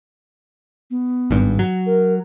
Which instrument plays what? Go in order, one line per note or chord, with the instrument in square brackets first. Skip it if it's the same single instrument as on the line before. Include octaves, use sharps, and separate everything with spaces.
[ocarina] B3
[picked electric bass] G#1 G2
F#3
[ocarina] A#4